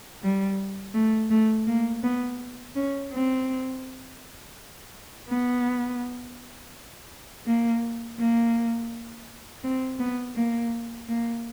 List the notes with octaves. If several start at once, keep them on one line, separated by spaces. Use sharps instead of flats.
G3
A3
A3
A#3
B3
C#4
C4
B3
A#3
A#3
C4
B3
A#3
A#3